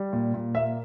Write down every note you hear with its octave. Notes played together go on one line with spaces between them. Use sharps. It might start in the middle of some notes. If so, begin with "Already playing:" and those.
Already playing: G3
A#2
A#2
A#3 E5